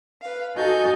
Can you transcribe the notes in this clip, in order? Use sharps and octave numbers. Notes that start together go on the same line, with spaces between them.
B4 F5
D#4 F#4 A4 D#5 G#5 G6